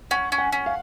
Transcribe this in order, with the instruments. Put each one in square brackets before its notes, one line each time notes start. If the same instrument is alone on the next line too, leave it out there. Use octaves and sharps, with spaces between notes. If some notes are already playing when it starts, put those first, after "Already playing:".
[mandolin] C#4 [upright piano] F#5
[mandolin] C#4
[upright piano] F#5
[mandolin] C#4
[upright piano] F5